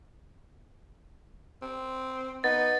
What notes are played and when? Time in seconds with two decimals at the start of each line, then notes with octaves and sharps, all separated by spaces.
1.62 C4
2.44 B3 D#4 A6